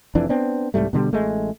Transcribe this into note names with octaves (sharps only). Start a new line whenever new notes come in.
F1 F2 E3 D4
B3 C4 D4
C2 G#2 G3 A3
B2 D3 D#3 G3
A1 G#3 A3